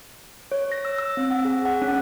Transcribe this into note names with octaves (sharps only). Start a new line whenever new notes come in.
C#5
A#6
E6
E6
C4
F#5
G#4
F#5
C#4